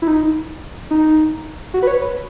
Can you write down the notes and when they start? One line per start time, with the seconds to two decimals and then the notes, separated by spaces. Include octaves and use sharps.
0.02 E4
0.07 D#4
0.91 D#4
1.74 F#4
1.83 B4
1.87 C#5
2.02 B4